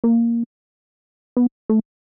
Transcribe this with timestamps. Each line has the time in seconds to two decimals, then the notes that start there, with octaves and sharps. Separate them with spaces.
0.04 A#3
1.37 B3
1.69 A3